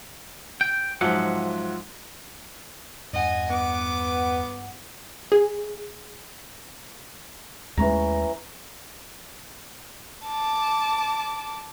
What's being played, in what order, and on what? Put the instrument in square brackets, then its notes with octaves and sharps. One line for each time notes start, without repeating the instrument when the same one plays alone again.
[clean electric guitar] G5
[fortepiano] G#2 F3 F#3 [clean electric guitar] F4 E5 F#5
[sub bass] E2 [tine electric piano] G2 F#5 [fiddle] D#5 G#5
[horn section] B3 [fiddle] D6
[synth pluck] G#4
[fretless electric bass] D#2 G#3 A3 [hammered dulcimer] E3 C#4 A#5
[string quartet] A5 D6